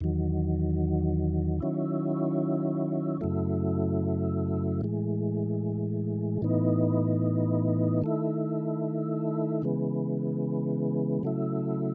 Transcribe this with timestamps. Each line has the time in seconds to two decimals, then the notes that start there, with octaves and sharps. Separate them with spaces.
0.01 E2 D#3 F#3
1.60 D#3 F#3 C#4 E4
3.21 F#2 C#3 F#3 A3 E4
4.81 A2 E3 G#3
6.42 A2 E3 B3 D#4
8.02 D#3 A3 E4
9.62 C#3 E3 G#3 B3
11.23 C#3 F#3 A3 E4